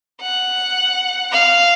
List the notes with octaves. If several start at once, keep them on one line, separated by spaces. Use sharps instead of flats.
F#5
F5